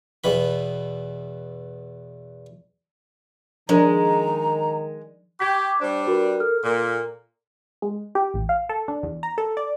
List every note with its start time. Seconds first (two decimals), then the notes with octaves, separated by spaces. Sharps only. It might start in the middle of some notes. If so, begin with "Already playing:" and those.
0.24 E2 B2 E3 B5
3.69 D#3 F3 G#3 D4 A#4 A#5
5.40 G4 C#6 G#6 B6
5.67 D6
5.81 G3 D4 C5
6.07 F#4 A#4 B4
6.40 A4 F6
6.64 A#2
7.82 G#3
8.15 G4
8.34 A1
8.49 F5
8.69 A4
8.88 D4
9.03 E2
9.23 A#5
9.38 A4
9.57 D5